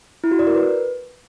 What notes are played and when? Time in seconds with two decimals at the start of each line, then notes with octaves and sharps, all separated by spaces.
0.24 E4
0.31 F#4
0.39 D5
0.47 A#4
0.55 B4